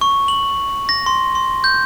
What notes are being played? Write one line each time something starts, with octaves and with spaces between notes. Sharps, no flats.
C#6
F#7
A#6
C6
C6
G6